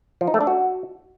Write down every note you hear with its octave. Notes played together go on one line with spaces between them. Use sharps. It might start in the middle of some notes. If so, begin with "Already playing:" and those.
F3
D#4
A3
D4
F#4